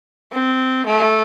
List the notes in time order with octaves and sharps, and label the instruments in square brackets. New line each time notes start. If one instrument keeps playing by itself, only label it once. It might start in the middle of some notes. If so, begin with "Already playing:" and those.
[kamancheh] C4
A3